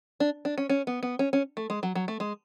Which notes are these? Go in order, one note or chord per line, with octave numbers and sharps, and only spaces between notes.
D4
D4
C#4
C#4
B3
B3
C#4
C#4
A3
G#3
F#3
F#3
A3
G#3